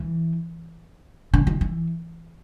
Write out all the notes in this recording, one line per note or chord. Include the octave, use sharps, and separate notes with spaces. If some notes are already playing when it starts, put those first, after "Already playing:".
Already playing: E3
D3
D#3
E3